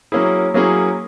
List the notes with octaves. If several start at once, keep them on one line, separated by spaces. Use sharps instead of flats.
F#3 A#3 C#4 E4 G#4
F#3 A#3 C#4 E4 G#4